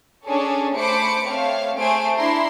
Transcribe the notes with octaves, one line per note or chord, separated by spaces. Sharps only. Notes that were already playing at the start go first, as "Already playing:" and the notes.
C#4 D4 G#4 A4 C#5
A3 C5 B5 D6 C#7 D7
A3 C4 C#5 F5
A3 G#4 C5 G#5 C6 D7
D4 E4 A#5 C6